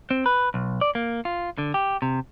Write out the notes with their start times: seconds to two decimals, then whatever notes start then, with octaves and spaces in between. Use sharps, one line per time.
0.11 C4
0.26 B4
0.54 B1
0.81 D5
0.95 A#3
1.25 F4
1.58 D3
1.74 G4
2.02 C3